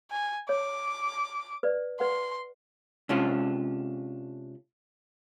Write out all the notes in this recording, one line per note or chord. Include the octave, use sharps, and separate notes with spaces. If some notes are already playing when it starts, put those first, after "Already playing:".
G#5
C#5 D6
B4 D5
B4 F#5 C6
C3 G#3 C#4 D4 F4 A4